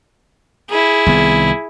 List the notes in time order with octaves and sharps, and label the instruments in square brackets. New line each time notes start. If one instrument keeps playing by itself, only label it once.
[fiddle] E4 G#4
[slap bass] C2 D#3 B3